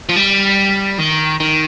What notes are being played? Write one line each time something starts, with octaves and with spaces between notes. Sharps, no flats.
F3
G3
D#3
D#3